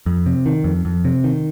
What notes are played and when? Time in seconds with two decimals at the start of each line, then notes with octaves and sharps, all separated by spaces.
0.06 F2
0.26 C3
0.46 D#3
0.64 F2
0.85 F2
1.05 C3
1.24 D#3